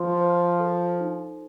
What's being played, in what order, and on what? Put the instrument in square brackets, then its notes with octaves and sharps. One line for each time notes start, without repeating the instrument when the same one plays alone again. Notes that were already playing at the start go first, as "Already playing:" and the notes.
Already playing: [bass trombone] F3 [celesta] C5 C6
[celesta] C5
A4
D#4